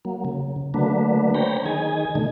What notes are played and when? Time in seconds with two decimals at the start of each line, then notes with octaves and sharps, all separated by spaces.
0.05 F#3 A#3
0.25 C#3
0.74 D3 F#3 A3 A#3 D4 B4
1.35 C5 C#5 G5 A#5 B5
1.66 D#3 G#4 G#5
2.15 B2 D3 D#3 A3